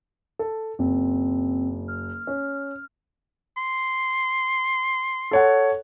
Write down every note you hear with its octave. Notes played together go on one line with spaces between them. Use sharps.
A4
F#1 C4
F6
C#4
C6
A4 C#5 F#5